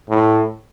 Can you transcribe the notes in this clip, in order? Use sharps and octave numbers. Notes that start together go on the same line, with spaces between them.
A2